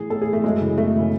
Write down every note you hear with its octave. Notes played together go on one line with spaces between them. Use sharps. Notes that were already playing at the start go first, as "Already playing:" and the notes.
Already playing: A2 E3 G#4
A2 A4
G#4
E3
A3
F#2 G#3
C#3 E3
F#2 A3
C#3 E3